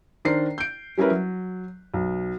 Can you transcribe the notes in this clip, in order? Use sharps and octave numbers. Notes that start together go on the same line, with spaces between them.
D#3 D4 A#4 C5 C7
G6 D7
G3 C#4 E4 A#4 B4
F#3
B1